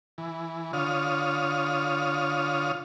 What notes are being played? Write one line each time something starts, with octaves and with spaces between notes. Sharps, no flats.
E3
D3 F4 C#5 D#6 F6